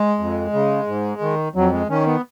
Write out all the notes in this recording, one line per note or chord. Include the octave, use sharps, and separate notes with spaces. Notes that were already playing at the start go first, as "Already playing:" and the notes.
Already playing: G#3
F2
C#3
G#2
D#3
F2 F#3
G#3
D#3 C#4
B3